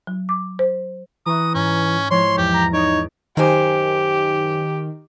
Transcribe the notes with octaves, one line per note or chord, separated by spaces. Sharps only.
F#3
D6
C5
E3 A#5 C#6 D#6 F#6
G#2 C#4
F3 G#3 E4 C#5 C6
E2 G4
A#5
D#4 C#5 D5
F#2 D#3 G4 C5 G#5